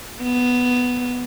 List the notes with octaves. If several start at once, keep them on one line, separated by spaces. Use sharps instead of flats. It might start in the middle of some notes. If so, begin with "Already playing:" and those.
B3